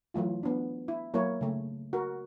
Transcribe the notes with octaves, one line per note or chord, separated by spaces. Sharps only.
E3 F#3 A3 F4
B3 D4
E4
F#3 A#3 E4 A#4 C#5
C#3 A3
F#4 A#4